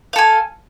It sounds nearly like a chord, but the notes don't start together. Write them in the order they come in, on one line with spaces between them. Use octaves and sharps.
F5 A4 G#5